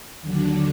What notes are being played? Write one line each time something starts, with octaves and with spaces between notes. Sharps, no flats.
D#2 D3 F#3 D4